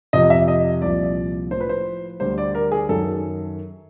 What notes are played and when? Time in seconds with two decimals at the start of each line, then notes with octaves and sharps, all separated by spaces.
0.13 F2 C3 F3 D#5
0.30 E5
0.48 D#5
0.82 C2 A#2 F3 D5
1.51 A2 F3 C5
1.61 B4
1.69 C5
2.20 D2 D3 G3 C5
2.38 D5
2.55 A#4
2.72 G#4
2.89 F#2 D#3 F#3 A4